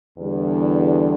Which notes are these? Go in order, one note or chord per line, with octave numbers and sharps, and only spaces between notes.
E2 D3 G3